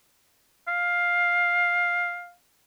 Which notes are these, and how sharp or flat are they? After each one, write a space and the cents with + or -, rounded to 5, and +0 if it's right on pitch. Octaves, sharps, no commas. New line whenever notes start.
F5 +10